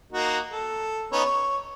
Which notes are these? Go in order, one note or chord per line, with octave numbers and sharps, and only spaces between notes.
A#3 D#4 F#4
A4
B3 C#4 D#4
C#5